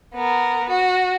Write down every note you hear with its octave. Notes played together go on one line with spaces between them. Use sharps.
B3 A#4
F#4